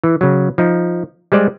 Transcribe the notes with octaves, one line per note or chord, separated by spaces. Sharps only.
E3
C#3 F#3
F3 D#4
G3 G#3 C5 D5